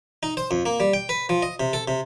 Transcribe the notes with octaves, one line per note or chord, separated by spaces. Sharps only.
D#4
C5
F2
A#3
G3
G5
B4
F3
D#5
C3
A4
C3